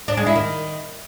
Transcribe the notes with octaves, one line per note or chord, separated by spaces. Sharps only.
D4
G#3
E4
D#3